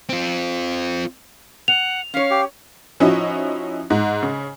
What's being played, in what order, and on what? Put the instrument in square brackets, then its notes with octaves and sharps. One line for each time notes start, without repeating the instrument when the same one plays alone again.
[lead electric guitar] C4 F4
[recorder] F#5 [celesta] F7
[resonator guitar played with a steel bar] C#4 C#5 [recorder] F5
[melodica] G4
[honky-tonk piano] F3 C#4 D#4 E4 F#4
G#2
C#3